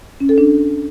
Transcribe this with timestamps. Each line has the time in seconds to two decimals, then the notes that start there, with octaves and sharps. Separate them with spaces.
0.20 C#4
0.29 A4
0.38 D4